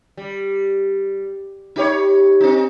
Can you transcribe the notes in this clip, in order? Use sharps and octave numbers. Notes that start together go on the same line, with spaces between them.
G3
D#4 G4 C#5
C4 D#4